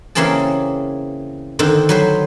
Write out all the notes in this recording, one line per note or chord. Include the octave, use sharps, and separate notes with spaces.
C#3 E3 A#3 C4 G#4 A5
D3 D#3 C4
F#3 B4 C5